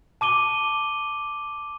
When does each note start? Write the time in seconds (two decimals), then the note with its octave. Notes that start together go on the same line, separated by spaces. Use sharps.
0.21 A5 D6 D#7 G7